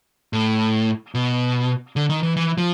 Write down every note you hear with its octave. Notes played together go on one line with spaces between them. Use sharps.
A2
B2
D3
D#3
E3
E3
F3